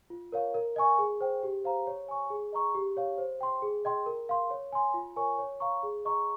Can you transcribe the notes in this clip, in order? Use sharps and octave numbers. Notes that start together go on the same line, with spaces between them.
F4
A#4 C#5 F5
A#4
D#5 G#5 C#6
G#4
C5 G5
G4
C5 F5 A#5
C#5
G#5 C#6
G#4
D#5 A#5 C#6
G4
C#5 F5
C5
G5 C6
G#4
D#5 G5 C6
A#4
F5 C6
C#5
G#5 C6
F4
A#4 C#5 G#5 C#6
C#5
F5 A#5 C#6
G#4
D#5 A#5 C#6